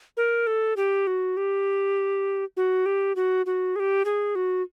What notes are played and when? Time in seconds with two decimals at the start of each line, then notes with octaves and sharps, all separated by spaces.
0.17 A#4
0.47 A4
0.77 G4
1.07 F#4
1.37 G4
2.57 F#4
2.86 G4
3.16 F#4
3.46 F#4
3.76 G#4
3.80 G4
4.05 G#4
4.35 F#4